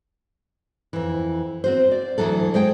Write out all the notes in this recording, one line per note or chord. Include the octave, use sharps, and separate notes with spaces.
F2 E3
C4 F#4 C5
D5
D2 G#2 E3 F#3 A4
G#3 C5 G5